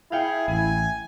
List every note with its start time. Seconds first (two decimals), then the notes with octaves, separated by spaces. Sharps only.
0.12 E4 G#4 F5 G5 C#7
0.48 A1 G#5